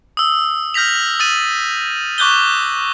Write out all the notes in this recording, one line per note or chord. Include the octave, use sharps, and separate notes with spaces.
D#6 E6
F6 G6 A#6 B6 F7
D#6 A6 D#7
C#6 D6 F#6 G6 G7